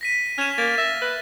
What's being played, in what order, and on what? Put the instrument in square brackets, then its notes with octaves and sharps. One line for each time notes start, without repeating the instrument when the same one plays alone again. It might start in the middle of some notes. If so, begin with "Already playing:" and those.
[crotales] A#6 B6 D#7
[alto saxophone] C#4 [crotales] F6 E7
[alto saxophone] A#3 [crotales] A6
[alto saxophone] E5 [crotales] A#6
[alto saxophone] B4